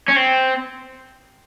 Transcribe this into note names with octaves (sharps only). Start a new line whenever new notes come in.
C#4
C4